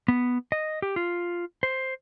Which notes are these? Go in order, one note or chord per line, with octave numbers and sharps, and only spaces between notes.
B3
D#5
G4
F4
C5